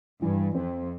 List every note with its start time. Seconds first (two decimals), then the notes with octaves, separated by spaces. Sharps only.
0.21 G2 E3
0.55 F2 C4